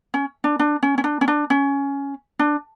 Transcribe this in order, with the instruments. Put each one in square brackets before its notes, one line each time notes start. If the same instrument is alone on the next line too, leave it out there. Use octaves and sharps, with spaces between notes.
[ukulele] C#4
D4
D4
C#4
C#4
D4
C#4
D4
C#4
D4